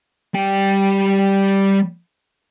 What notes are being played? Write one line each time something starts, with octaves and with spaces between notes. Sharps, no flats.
G3 G5